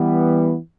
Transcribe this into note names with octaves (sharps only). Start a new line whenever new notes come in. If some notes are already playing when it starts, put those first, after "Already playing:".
Already playing: E3 G3 B3